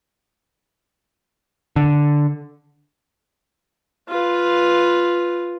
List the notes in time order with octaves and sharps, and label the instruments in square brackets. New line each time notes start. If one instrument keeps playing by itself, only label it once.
[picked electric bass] D3
[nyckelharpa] F4 B4